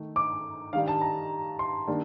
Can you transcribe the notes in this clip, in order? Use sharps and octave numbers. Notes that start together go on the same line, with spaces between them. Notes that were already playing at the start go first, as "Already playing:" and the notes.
Already playing: D#3 A3
D6
D#3 G3 D4 F5
A5
A#5
C6
D#3 G3 A#3 D4